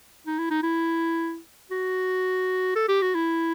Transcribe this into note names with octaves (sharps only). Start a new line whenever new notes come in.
D#4
E4
D#4
E4
F#4
A4
G4
F#4
E4